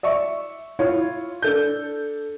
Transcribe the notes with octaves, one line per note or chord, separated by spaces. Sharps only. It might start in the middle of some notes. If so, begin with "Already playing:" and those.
D5 E5 C#6
E4 F4 C#5
D4 A4 G6